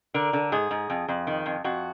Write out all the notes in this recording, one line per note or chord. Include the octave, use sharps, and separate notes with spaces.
D3 A#4
D3
G#2 G#4
G#2
F2
F2
D#3
F2
F2 F#4